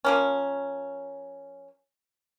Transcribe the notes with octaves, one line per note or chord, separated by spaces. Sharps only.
F3 A#3 C#4